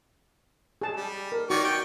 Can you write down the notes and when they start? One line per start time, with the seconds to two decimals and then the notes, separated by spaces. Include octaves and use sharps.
0.81 G#4 A5
0.97 G3
1.32 A#4
1.50 D#3 F#4 D5 C#6
1.64 G5